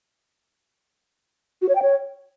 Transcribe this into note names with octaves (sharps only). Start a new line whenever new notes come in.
F#4
C#5
G5
C#5